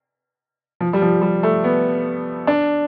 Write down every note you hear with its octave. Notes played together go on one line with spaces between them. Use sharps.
F3
G3
F3
G3
A3
B3
D4